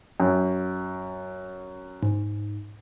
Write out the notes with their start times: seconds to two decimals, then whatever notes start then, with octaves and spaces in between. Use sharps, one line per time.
0.20 F#2
2.03 G#2